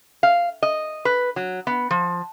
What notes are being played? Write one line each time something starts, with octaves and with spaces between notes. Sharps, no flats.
F5
D#5
B4
F#3
B3
F3